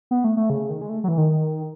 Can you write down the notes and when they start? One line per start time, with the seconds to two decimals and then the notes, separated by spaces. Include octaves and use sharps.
0.11 B3
0.24 A3
0.37 A3
0.50 C#3
0.70 D#3
0.81 G#3
0.89 A3
1.04 F#3
1.08 E3
1.18 D#3